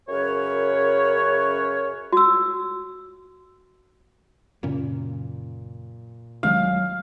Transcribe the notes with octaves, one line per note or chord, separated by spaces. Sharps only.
F#2 C#3 A#4 B4 C#5
F#4 E6
F#2 A#2 C#3 C#4
D#1 D#3 F#3 G#3 F5